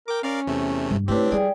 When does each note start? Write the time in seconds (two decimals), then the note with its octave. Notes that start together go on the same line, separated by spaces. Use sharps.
0.08 A#4 G5 D6
0.23 C#4 A#4 D5 F5
0.47 E2 C3 A3
0.91 G2
1.08 C#3 A3 C4 D4 E4 G4 B4 C#5
1.32 G3 G#4 D5 G5